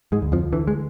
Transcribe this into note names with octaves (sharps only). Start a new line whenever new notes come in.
G#2 G#3
D2
F2 F3
D3 E3
G#3